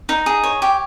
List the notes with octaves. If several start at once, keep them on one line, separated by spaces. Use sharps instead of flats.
D#4
G#4
C#5
G4